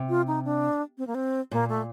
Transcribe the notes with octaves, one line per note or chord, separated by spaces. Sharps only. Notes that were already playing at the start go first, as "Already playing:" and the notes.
Already playing: C3
F4
D#4
D4
C4
A#3
C4
A#2 A#3
A3